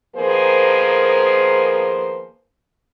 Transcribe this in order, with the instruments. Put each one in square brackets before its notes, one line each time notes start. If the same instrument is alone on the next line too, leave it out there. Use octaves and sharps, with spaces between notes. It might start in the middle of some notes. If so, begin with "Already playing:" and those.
[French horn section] D#3 F3 A#3 B3 G#4 C5